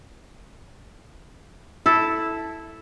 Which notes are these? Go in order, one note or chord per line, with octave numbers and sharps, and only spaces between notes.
E4 A4